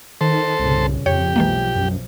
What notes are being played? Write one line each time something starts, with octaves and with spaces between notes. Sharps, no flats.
D#3 A4 C5
C2 G2 A#2 C#3
F2 C#3 G4 C#5
B1 E3 F3 G#3 A#3
F#2